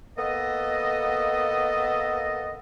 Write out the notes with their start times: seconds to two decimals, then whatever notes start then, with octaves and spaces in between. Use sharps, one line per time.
0.18 A#3 B3 A4 D#5